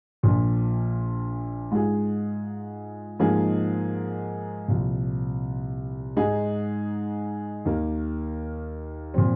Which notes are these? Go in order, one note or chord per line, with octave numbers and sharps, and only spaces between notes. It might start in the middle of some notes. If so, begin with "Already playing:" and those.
A#1 A#2 F3
G#2 G#3 F4 G#4
G#2 F3 A#3 D#4 G#4
C2 A#2 F3
G#2 G#3 D#4 G#4
D#2 D#3 A#3
A#2 F3 C4